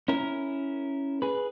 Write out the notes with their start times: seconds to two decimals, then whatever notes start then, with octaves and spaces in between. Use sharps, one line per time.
0.08 C#4 E4 A#4
1.22 G#4 B4